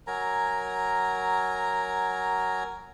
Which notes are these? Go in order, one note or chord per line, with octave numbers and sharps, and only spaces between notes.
F#3 A#4 G#5 A#5